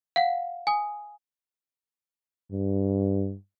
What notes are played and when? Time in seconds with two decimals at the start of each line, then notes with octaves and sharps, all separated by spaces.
0.16 F5 F#5
0.67 G#5 D#6
2.52 G2